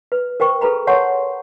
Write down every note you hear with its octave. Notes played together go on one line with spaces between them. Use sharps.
B4
A#4 C5 G5 C#6
G#4 A4 B4 A#5 B5
C#5 F#5 A5 C6 C#6